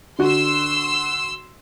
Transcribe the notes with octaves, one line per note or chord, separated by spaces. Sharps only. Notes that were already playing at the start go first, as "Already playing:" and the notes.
D3 F#4 C6 E6